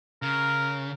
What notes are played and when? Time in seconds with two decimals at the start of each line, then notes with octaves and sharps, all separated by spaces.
0.22 C#3 A#4